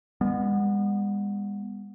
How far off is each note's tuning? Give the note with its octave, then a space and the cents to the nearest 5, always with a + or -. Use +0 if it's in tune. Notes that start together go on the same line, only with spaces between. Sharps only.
G#3 -45 B3 -15